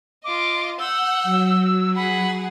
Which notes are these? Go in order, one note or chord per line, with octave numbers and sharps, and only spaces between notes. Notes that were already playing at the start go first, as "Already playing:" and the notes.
F4 D#5 D6
F#5 E6 G6
F#3
G#4 F#5 B5